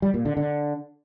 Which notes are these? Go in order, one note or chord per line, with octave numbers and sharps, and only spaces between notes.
G3
A#2
D3
D3